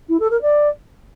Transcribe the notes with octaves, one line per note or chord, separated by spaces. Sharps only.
E4
A4
A#4
D5